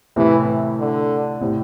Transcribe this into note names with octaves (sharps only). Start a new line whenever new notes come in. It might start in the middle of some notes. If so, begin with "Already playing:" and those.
A2 C3 E3
D3
A2 C3